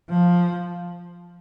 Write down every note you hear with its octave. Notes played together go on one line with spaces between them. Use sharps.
F3